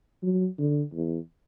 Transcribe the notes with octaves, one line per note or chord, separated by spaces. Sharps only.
F#3
D3
E2